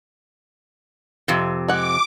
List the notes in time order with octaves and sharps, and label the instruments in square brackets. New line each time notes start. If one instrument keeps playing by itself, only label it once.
[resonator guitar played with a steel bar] F2 C3
[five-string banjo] G#3 F#5 [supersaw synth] D6